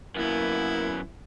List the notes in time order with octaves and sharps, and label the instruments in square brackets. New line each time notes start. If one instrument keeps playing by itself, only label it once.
[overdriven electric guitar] F#2 B3 [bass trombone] A#3 [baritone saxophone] E4